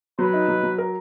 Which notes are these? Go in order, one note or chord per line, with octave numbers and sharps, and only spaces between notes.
F#3 B4
D#4
F#3
F#3
A#4